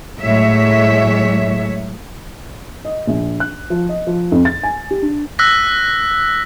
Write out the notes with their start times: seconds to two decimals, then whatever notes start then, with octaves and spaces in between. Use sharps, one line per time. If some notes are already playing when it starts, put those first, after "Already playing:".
0.21 A2 F#3 G#3 C#5 E5
2.85 D#5
3.07 A#1
3.40 F#6
3.70 F3
3.89 D#5
4.07 F3
4.32 F2
4.45 A6
4.63 G#5
4.91 G4
5.02 D4
5.39 E6 F#6 A#6 B6